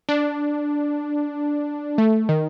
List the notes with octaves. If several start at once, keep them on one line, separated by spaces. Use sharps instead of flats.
D4
A3
D#3